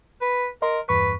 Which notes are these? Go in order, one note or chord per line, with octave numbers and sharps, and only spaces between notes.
B4
A#4 D#5 C6
E2 G2 B4 C#6